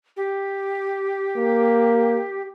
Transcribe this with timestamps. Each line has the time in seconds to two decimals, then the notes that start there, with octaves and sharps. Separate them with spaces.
0.16 G4
1.37 A#3